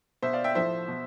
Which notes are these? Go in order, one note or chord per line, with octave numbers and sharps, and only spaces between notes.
B2 C5 E5
D5 F5
E5 G5
A2 F3 C5 E5
B2